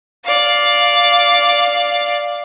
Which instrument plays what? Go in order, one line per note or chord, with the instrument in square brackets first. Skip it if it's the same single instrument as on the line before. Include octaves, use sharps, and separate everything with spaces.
[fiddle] D5 F5